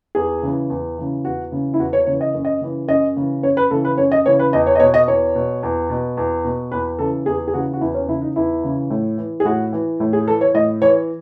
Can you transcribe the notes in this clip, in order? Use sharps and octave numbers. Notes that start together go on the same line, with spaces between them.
E2 G#4
C#3 E3
E2
C#3 E3
E2 F#4
C#3 E3
E4
E2 F#4
C#5
C#3 E3 C#5
D#5
F#2
D#5
C#3 E3
F#2 D#5
C#3 E3
F#2 C#5
B4
C#3 E3 A4
B4
F#2 C#5
D#5
C#3 E3 C#5
B4
E2 D#5
C#5
D#5
B2 C#5
D#5
E2 C#5
B2
E2
B2
E2
B2
E2 B4
C#3 E3 A4
E2 G#4
G#4
C#3 E3 F#4
F#4
E2 E4
C#4
C#3 E3 E4
D#4
E2 E4
C#3 E3
A2
E3
G#4
A2 F#4
E3
A2
G#4
E3 A4
C#5
A2 D#5
E3 C#5